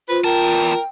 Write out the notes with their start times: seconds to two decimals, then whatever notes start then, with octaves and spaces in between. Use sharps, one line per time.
0.09 F4 B4 C5
0.24 E2 A#4 G5 A5